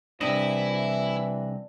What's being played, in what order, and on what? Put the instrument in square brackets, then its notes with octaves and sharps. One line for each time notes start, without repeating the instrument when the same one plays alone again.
[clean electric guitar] C2 C4 D#5 [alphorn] E3 [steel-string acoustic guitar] D4 [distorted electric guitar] E4 E5